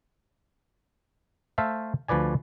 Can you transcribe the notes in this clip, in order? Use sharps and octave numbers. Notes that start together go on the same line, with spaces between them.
A3 A4 C5 E5 F5
D2 F3 B4 D5 G#5